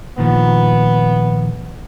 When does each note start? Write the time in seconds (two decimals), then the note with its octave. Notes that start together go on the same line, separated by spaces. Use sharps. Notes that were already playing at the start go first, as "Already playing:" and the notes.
0.18 A#2 D#3 F3 B3